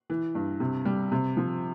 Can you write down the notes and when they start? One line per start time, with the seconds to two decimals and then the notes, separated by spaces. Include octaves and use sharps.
0.10 E3
0.35 G2
0.60 C3
0.85 G3
1.12 C3
1.37 F3